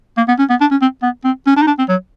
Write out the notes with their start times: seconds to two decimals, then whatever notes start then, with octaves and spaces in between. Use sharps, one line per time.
0.17 A#3
0.28 B3
0.39 C#4
0.49 B3
0.60 D4
0.71 C#4
0.81 C4
1.02 B3
1.24 C4
1.46 C#4
1.56 D4
1.62 D#4
1.67 D4
1.78 C4
1.88 F#3